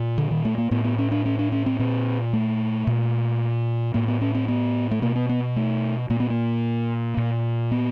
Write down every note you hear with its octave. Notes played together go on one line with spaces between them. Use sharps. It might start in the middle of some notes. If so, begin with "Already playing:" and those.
Already playing: A#2
D3
D#3
A3
A#3
A2 B3
B3
C#4
D4
C#4
D4
C#4
C4
A#2 C4
A3
A#2
A2 A#3
B3
C#4
C4
B3
A3
B2 A#3
B3
B3
A3
A#2 A#3
B3
A#3
A#2
B3